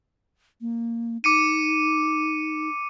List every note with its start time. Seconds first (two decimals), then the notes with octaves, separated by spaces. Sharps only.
0.61 A#3
1.24 D#4 D6 C#7 D#7